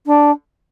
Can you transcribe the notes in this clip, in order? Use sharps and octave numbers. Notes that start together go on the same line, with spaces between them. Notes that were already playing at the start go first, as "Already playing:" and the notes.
D4